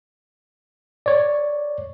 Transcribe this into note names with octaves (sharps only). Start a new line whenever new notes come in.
C#5 D5